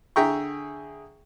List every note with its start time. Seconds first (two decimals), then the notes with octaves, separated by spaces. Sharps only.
0.16 D3 G#4 E5 G5 A#5 C#6